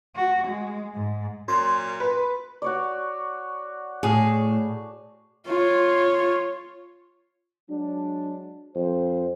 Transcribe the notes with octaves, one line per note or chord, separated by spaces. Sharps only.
F#4
G#3
G#2
F#2 A#2 C6
B4
F#4 C#5 D5
A2 G#4
F4 C#5
F#3 G#3 D4
F2 C5